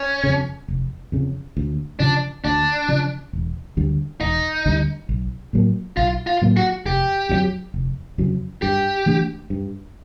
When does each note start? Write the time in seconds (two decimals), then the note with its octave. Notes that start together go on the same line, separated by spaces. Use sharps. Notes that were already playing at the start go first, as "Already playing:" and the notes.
Already playing: C#4
0.24 F2 C#3
0.68 F1
1.12 F2 C#3
1.57 D2
2.00 C#3 F3 D4
2.45 D2 D4
2.88 C#3 F3
3.33 E1
3.77 D2 D3 G3
4.21 E1 D#4
4.66 D2 D3 G3
5.09 B1
5.53 A2 F#3 A#3
5.97 B1 F4
6.27 F4
6.42 A2 F#3 A#3
6.57 F#4
6.86 F1 G4
7.29 F2 C#3 F#3
7.74 F1
8.18 F2 C#3 F#3
8.62 G2 G4
9.06 E3 A3 D4
9.50 G2